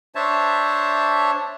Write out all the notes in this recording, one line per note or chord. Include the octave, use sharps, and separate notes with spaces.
D4 C5 C#5 E5 A5